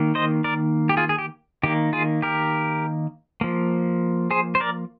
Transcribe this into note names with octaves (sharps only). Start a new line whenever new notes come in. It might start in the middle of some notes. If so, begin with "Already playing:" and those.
Already playing: D#3 A#3
C5 D#5
A#4 D5
G4
F4 G#4
G#4
G4
D#3 A#3 G4
F4 G#4
G4 A#4
F3 A#3
G#4 C5
C5
A#4 D5